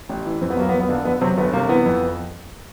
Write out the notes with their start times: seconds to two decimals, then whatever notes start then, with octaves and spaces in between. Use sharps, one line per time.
0.09 A1
0.26 E3
0.41 F2 C4
0.50 B3
0.57 F#3 A#3
0.69 B3
0.73 F2
0.80 B3
0.89 D3 A#3
1.05 F2 B3
1.21 C3 F#3 C4
1.37 G1 B3
1.53 C3 A#3
1.69 E3 B3
1.86 F2